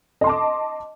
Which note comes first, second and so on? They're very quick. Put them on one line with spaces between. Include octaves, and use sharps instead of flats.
D#5 C6 A5 D6